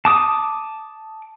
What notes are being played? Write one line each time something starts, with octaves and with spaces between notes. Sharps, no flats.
A5 D6 D#6